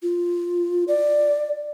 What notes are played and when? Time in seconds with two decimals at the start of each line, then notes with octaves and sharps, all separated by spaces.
0.03 F4
0.88 D5